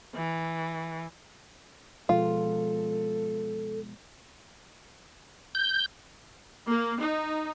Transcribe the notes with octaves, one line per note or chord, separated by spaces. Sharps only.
E3
B2 F3 G#3 F4 A4
G6
A#3
D#4